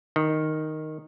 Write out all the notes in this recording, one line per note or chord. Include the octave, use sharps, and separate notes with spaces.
D#3